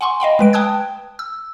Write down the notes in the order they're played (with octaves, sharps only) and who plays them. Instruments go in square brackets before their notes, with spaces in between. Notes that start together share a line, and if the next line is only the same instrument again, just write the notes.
[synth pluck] F#5 G#5 C6 C#6
D#5 F5 G5 B5
G#3 B4 D7
G5 A5 D#6 F#6 G#6
E6